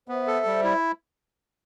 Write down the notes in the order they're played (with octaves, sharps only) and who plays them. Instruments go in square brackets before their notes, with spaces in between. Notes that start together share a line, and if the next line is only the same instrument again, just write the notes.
[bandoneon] B3 [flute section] C5 E5
[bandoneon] A4
G3
E4